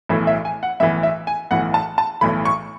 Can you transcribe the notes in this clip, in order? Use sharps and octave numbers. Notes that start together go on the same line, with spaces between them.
B1 A2 E3 E5
E5
G#5
F#5
B1 A2 E3 E5
E5
G#5
B1 A2 E3 F#5
A5
A5
B1 A2 E3 B5
C#6